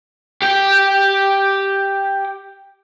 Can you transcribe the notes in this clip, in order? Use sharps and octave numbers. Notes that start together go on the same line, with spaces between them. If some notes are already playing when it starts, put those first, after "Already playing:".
G4 G5